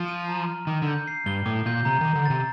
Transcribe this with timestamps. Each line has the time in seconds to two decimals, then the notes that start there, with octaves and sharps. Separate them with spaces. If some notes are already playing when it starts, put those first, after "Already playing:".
Already playing: F3
0.08 D#7
0.28 A#5
0.48 F6
0.67 D#3 D6
0.82 D3 G6
1.08 C7
1.26 G2 G7
1.46 A2 D6
1.66 A#2 G6
1.85 C3 A#5
2.01 D#3 D6
2.15 D3
2.26 C3 A6